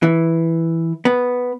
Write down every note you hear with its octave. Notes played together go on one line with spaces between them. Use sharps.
E3
B3